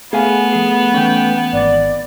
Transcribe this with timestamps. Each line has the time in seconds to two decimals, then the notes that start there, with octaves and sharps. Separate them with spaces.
0.13 A3 B3 G#4 F5 G#5
0.53 F3 G#4
0.94 E3 C#4 G5
1.53 G#1 D5